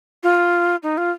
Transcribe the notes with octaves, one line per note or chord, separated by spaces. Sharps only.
F4
D#4
F4